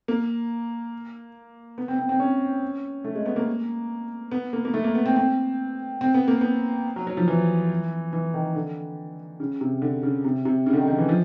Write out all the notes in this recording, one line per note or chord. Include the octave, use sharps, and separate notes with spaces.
A#3
B3
C4
C4
C4
C#4
A3
G#3
B3
A#3
B3
A#3
A#3
A3
A#3
B3
C4
C4
C4
B3
A#3
B3
F#3
F#3
F3
E3
E3
D#3
D3
C#3
C3
D3
C#3
C3
C3
C#3
D3
D#3
D#3
E3
F3